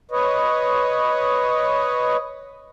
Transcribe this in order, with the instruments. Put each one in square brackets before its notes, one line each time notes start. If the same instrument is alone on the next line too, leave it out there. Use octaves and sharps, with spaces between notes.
[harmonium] B4 C#5 D#5